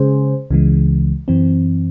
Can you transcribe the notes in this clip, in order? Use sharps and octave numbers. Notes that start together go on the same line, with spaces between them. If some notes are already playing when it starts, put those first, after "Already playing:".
Already playing: C#3 G#3 C#4 G#4 C5
C#2 C#3 E3 G#3
F#2 E3 C4